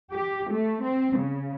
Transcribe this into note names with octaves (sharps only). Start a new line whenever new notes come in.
G4
A3
C4
C#3